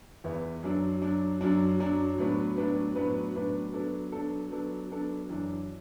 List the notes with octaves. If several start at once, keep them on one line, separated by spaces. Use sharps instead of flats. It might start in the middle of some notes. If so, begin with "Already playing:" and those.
E2 E3 B3 E4
F#2 F#3 D4
F#2 F#3 D4
F#2 F#3 D4
F#2 F#3 D4
A2 F#3 B3 D4 B4
A2 F#3 B3 D4 B4
A2 F#3 B3 D4 B4
A2 F#3 B3 D4 B4
F#3 B3 D4 A4
F#3 B3 D4 A4
F#3 B3 D4 A4
F#3 B3 D4 A4
F#2 E3 D4